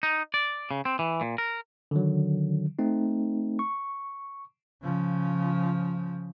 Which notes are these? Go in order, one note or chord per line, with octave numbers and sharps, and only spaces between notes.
D#4
D5
C#3
C4
E3
A#2
A#4
D3 D#3 F#3
A3 C4 D#4
C#6
C#3 F3